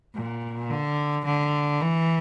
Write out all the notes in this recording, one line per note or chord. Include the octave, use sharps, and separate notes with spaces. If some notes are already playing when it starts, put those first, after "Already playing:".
A#2
D3
D3
E3